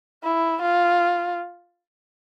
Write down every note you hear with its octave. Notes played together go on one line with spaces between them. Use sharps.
E4
F4